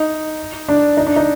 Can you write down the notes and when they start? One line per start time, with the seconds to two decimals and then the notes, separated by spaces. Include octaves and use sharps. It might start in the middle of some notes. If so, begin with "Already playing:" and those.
Already playing: D#4
0.69 D4
0.97 D#4
1.07 D4
1.16 D#4